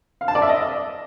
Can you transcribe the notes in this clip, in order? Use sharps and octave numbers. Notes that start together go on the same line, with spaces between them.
F5
A5
D5
E5
D#5